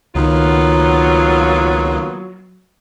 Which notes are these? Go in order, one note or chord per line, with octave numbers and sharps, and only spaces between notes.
C#2 D#3 F#3 A#3 B3 F4